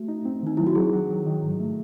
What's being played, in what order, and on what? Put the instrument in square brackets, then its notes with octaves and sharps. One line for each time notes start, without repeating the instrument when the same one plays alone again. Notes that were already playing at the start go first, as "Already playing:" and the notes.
Already playing: [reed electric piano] A3 [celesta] F#4
[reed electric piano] D#4
C4
[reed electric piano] D#3 [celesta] D#4
[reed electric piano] F#3 [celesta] E4
[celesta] F#4
[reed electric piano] F#3 [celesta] G#4
[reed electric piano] F#3
D#3
D#3
G#2
A3